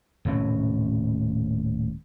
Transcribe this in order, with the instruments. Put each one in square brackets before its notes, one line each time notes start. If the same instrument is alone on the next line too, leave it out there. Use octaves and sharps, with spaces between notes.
[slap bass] D#1 A2 C3 C#4